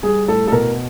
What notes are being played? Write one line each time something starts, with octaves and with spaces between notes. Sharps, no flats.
G3 G#4
A2 A4
A4
B2 A#4